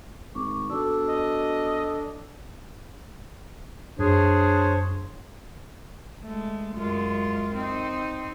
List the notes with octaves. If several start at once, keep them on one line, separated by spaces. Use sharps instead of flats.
G#1 C#6 D6
B2 D4 A4 E6
D#5
F#2 D4 G#4 C5 C#5
G#3 A3
F#2 G#3 F4
C4 D#4